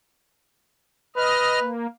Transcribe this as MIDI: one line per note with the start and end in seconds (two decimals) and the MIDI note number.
1.16 1.69 71
1.16 1.59 75
1.16 1.59 89
1.60 1.87 58